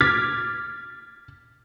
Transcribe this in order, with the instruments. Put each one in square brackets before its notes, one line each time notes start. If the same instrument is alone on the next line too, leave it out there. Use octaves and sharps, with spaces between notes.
[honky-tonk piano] D6 F6 G#6 A6 B6